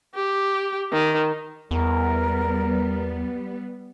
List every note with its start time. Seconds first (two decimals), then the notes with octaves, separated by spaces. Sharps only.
0.15 G4
0.93 D#3
1.71 E2 G3 B3 A#4